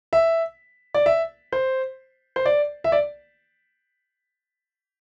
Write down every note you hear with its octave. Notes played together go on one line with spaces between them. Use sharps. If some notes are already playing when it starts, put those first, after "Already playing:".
E5
D5
E5
C5
C5
D5
E5
D5